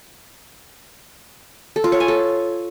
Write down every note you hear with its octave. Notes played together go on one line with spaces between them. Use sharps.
A4
F4
C#5
G#5
A4